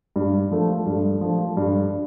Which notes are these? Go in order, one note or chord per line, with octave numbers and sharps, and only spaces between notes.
G2
F3 A3
G2
F3 A3
G2